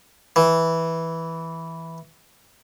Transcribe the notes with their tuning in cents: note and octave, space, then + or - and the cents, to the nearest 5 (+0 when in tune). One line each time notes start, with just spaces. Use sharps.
E3 -5